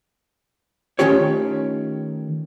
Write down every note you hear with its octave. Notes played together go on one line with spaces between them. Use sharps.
D#3 A3 C#4 F4 G4 C#5